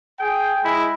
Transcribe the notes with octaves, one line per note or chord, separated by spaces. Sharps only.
G#4 G5
G#3 E4